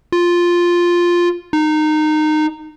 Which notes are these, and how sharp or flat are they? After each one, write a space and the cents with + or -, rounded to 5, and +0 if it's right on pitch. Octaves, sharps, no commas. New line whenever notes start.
F4 +0
D#4 -20